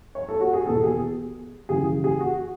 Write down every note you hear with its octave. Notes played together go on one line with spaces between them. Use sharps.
C#5
A4
F#4
G#4
E2 B2 A4
G#4
F#2 C#3 E3 G#4
G#4
F#4